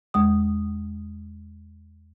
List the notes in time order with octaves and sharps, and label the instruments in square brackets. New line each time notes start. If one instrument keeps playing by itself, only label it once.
[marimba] E2 G#3 D#6